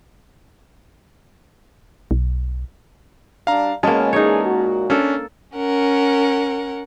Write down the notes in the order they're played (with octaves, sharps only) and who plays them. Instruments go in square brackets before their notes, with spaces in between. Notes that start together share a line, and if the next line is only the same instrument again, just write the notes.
[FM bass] B1
[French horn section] G3 D4 [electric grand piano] F5 A#5
[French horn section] B2 G#4 C#5 [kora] G#3 A#3 [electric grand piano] C#4 A5
[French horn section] D3 E3 G#4 [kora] D#4 C#5
[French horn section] A#2 F#4
[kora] A#3 A4 [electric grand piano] C#4 D4
[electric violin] C#4 [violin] A#4 F#5